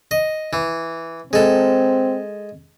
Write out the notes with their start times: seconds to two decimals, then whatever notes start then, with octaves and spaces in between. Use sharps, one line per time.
0.11 D#5
0.53 E3
1.33 G#3 C4 A4